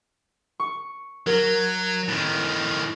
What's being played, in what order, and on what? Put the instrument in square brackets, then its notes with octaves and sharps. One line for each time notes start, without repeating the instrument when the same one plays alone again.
[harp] C#6
[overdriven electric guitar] F#3 [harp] A#4
[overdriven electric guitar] A2 D#3